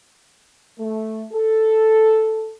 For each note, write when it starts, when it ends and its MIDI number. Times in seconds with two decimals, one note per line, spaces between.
0.77 1.24 57
1.31 2.54 69